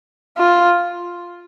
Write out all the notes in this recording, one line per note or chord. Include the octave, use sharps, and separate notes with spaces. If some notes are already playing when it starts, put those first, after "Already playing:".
F4